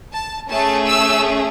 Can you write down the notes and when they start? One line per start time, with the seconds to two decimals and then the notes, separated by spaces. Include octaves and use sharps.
0.12 A5
0.49 A3 C#4 G#4 A5
0.87 E6